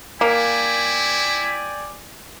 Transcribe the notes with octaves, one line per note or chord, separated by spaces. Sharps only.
A#3 E4 D5 G5 G#5